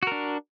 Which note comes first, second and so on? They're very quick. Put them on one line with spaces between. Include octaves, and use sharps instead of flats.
F#4 A#4 D4